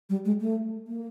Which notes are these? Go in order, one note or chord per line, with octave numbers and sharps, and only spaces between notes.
G3
G#3
A3
A#3